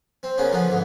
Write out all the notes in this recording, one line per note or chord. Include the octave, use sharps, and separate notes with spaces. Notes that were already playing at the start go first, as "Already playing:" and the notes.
C4
C#3 A#3 B3 C#4
D3 F3 B3 D4
G#2 D3 E3